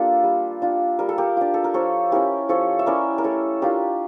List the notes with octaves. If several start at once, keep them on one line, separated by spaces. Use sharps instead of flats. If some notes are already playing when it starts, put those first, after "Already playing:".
Already playing: A#3 D4 F4 G4 A4
G3
D4 F4
G3 A#4
A4
G4 A#4
D4 F4
A4
A#4
F3 A4 C#5
C#4 E4 G4 A#4
F3 A4 C#5
E5
C#4 E4 A#4 D5
A#4
A3 A4 C#5
D4 F4 G4 A#4